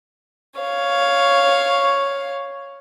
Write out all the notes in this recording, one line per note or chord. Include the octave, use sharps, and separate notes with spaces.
C#5 F5